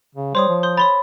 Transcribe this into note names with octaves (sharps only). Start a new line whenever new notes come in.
C#3
G3 C5 C#5 C6 D#6
F3
C6 D#6 G6
C#5 B5 C6 A6